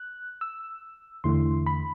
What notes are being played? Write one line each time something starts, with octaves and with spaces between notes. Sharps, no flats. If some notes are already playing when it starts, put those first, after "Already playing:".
Already playing: F#6
E6
E2 D3 A3 E4 C6
B5